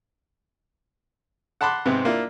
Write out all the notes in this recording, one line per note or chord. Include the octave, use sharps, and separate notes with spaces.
F#5 A5 B5 C6 D6 F#6
G#2 C3 B3 C4
A#3 D4 E4 F4